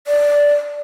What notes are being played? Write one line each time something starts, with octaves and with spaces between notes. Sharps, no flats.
D5